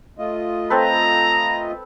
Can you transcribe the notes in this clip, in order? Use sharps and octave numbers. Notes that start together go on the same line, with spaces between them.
A3 F4 D#5
C4 A4 B4 A#5